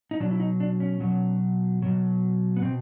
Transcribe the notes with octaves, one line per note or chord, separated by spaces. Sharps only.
D#4
B2 F#3 D4
E4
D#4
D4
C#4
B2 F#3
B2 F#3
B3
B2 C4